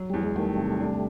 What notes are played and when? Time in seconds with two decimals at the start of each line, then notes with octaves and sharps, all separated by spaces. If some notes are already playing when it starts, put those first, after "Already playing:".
Already playing: F#3
0.10 E2 G3
0.23 G#3
0.36 D#3 G3 A3
0.58 C3
0.80 D4